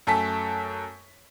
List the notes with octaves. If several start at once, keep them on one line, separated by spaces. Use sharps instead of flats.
F#2 A3 A4 G#5 A5 B6